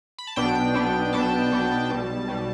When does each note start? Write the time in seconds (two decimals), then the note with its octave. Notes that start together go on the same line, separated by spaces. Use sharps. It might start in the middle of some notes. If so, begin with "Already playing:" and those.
0.18 B5
0.27 A5
0.36 B1 B2 B3 D4 G5
0.75 B1 B2 B3 D4
1.13 B1 B2 B3 D4 A5
1.52 B1 B2 B3 D4
1.90 B1 B2 G3
2.28 B2 G3